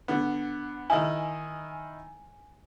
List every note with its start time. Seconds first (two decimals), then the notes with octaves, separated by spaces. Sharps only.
0.08 D3 B3
0.90 D#3 D#4 E4 G#5